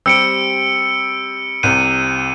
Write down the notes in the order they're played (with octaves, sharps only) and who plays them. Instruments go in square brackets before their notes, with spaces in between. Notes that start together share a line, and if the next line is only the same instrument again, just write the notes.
[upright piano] G3 C4 G4 [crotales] E6 C#7 D7
[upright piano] C2 C3 [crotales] D#7